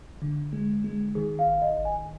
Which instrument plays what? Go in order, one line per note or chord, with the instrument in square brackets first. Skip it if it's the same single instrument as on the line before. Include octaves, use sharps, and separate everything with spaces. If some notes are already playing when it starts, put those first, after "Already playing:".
[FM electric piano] D3
G#3
G#3
[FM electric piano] D#3 [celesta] G#4
[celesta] F5
[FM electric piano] G#1
[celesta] D#5
[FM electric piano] G#1
[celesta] G#5